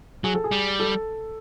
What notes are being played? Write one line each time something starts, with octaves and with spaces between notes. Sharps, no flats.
F#3 G#4
A4
G#4
G3
A4